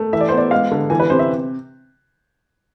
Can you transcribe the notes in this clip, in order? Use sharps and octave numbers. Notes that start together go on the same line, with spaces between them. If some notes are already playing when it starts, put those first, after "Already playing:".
Already playing: A3
E3 E5
D5
C5
B3
D5
G#3 F5
D3
E3 G#5
B4
C3 C5
E5